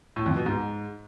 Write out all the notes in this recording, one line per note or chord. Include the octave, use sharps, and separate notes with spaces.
A2
F2
B2
G#2